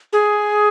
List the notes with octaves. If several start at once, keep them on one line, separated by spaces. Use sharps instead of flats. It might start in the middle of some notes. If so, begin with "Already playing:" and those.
G#4